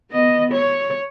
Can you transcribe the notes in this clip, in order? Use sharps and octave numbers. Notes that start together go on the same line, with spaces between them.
B3 D#5
C#5